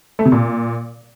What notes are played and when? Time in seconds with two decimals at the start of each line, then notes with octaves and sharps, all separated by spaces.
0.19 A3
0.26 C3
0.32 A#2